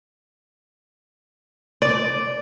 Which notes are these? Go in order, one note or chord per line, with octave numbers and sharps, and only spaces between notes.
D5